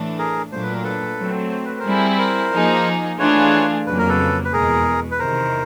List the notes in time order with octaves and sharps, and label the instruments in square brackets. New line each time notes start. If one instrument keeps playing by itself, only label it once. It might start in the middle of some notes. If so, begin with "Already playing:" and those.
Already playing: [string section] A2 E3 A3 D4
[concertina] G#4 A#4
[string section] A#2 F#3 A3 D4 [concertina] C5
[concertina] B4
A#4
A4 B4
[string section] F#3 A3 C4
[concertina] C5
B4
A#4 C5
[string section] G3 C4 E4 G#4
[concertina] A#4 C5
[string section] F3 A#3 D#4 G#4
[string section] E3 A3 D4 F4 G#4 [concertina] B4 C#5
[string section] F2 C#3 F#3 A#3 [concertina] B4
[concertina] A#4
A4 B4
B4
[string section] E2 B2 G#3 [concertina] G#4 A#4
[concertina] B4
[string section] E2 C3 D#3 [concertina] A#4 C5